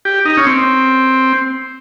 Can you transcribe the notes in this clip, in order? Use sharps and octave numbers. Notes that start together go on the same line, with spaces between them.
G4
D#4
C#4
C4